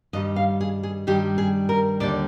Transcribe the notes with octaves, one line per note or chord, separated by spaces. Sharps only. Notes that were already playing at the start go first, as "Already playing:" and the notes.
G2 D#3 G3 D#5
F5
G#4
G#4
G2 D#3 G3 G4
G#4
A#4
D#2 D3 G3 D5